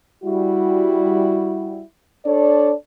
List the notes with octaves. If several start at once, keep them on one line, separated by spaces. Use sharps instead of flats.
G3 E4 F#4
D4 A4 C#5 D5